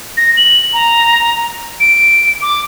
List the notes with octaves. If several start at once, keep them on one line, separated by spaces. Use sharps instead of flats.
A#6
F#7
A#5
D7
D6